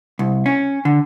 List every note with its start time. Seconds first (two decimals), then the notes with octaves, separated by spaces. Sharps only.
0.19 C2
0.46 C#4
0.85 D3